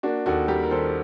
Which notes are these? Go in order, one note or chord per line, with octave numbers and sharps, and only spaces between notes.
A#3 D4 F#4
D#2 F#4 A4
G3 G4 A#4
A#4
D#3 A4 C5